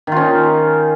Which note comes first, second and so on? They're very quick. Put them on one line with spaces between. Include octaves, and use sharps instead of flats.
D#3 F4 C#4 D#4